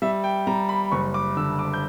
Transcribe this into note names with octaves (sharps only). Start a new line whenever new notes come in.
G3 E5
G5
G3 A#5
B5
F#1 C#6
D6
D3 E6
D6
G6